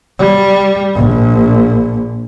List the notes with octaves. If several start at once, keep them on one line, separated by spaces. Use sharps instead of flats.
G3
A#1